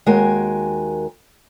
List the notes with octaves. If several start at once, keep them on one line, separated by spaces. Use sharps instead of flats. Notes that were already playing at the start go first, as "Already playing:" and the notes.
D#2 G#3 F#4 A#4 G5 G#5